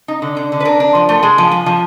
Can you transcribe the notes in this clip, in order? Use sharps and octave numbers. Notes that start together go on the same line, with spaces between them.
D#4
D3
D3
D3
B4
D4 A#4
D4
F3
A3
G#3
F3
F3
F3